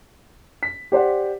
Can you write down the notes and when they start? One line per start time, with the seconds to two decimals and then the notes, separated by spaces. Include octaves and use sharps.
0.63 B6
0.92 G4 C5 D5 F#5